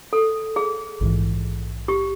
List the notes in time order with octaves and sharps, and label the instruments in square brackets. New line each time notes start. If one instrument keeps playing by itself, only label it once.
[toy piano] A4
G#4
[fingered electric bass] A#1 G#2 E3
[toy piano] G4